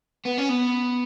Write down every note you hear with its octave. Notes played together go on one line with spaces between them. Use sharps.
B3
C#4
B3